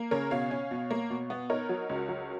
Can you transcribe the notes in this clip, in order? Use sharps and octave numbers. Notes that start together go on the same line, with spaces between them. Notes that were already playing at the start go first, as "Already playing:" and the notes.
Already playing: A#3
C#3 A#4 C#5
B2 C#5 F5
C#4
B2
A#3
B2
B3
D#4 A#4 C#5
F#3
C#2
F#3